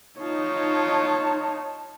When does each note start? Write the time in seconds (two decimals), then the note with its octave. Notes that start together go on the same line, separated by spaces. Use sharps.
0.20 D#4 F4 C#5 A5